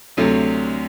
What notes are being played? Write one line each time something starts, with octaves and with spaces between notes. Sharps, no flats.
D2 C3 F#3 A3